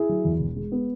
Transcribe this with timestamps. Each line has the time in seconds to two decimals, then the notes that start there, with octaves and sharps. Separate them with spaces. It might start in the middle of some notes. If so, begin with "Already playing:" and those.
Already playing: E4 G#4
0.09 F#3
0.25 E2
0.40 E1
0.56 G#3
0.72 B3